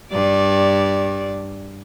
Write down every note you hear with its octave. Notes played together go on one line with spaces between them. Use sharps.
G2 D5